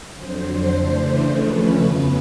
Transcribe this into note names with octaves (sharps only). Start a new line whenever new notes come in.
F2 D3 F#3 C5
C#3 E3 A3 D4
D#2 C#3 F3 A3 C#4 B4
F2 C#3 F#3 B3